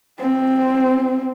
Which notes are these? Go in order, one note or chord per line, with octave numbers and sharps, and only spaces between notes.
C4